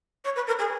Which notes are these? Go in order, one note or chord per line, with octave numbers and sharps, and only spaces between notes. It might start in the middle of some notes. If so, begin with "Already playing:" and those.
C#5
B4
A#4
G#4